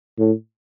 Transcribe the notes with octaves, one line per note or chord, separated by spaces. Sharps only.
A2